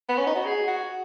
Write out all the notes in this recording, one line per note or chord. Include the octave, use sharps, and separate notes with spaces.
B3
C#4
D#4
F#4
G#4
F#4